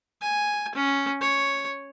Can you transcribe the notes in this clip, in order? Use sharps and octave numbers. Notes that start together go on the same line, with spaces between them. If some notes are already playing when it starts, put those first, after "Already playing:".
G#5
C#4
C#5